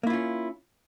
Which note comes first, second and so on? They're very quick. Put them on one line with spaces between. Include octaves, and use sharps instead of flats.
A#3 E4 F4 C#4